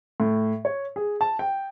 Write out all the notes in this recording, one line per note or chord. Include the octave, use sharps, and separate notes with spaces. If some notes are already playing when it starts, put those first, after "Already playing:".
A2
C#5
G#4
A5
G5